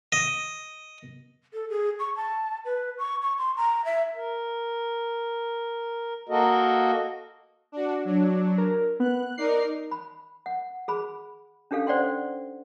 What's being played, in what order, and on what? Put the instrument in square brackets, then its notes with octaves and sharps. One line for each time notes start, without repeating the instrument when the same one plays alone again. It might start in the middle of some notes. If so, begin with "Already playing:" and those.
[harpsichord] D#5
[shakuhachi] A4
G#4
C#6
A5
B4
C#6
C#6
C6
A#5
E5
[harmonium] A#4
A#3 F#4 A4 A#4 D#5
[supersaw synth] D4 F#4
F#3 D4
[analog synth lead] A#4
[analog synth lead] B3 [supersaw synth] F#6
[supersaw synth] D#4 A#4 D5 [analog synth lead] C7
[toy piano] B5
F#5
G#4 B5
C#4 D4 G4 A4 F5
C5 D5 F#5 G5 C6